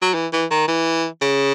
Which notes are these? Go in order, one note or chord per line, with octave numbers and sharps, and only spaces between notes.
F#3
E3
E3
D#3
E3
C#3